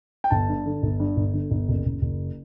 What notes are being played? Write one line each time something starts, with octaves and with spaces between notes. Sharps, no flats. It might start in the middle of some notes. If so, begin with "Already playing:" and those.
G5
G1 A5
G2
D3
G1
G2
G1
D3
G1
F#1
F#1
F#1